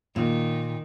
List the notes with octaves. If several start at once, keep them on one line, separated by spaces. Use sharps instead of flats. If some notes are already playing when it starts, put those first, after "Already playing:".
A#2 D#3